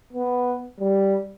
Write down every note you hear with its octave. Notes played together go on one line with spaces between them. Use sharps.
B3
G3